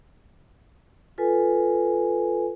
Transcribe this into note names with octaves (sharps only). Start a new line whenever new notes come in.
F4 A4 B4 G#5